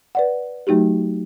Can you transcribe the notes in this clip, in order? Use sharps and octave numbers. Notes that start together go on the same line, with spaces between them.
B4 D5 F#5
F#3 A3 D#4 F#4 G4